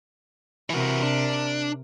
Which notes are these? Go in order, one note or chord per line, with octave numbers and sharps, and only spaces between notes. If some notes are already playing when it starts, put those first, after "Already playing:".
C3 E3 F#4 A#4
D4